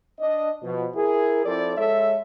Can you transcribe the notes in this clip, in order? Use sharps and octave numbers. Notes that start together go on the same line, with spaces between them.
D4 D#5
B2 F3
E4 G#4 A#4
F3 C4 E4 A4 D5
G#3 A4 C#5 E5